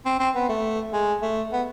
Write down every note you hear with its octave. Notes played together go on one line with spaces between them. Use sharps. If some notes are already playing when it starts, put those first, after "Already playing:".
C4
C4
B3
A3
G#3
A3
B3